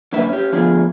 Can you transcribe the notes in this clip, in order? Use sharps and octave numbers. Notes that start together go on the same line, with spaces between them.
F#2 D3 A#3 B4 E5
C#4 G4
D3 F3 A3 B3 F4 G#4